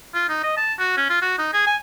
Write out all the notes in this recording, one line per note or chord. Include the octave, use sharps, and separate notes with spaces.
F4
D#4
D#5
A5
F#4
C#4
F4
F#4
D#4
G#4
G#5